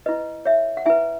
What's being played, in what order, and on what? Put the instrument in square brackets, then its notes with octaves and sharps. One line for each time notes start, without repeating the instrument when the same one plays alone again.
[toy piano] E4 B4 D#5
C#5 E5
F#5
E4 B4 E5 G#5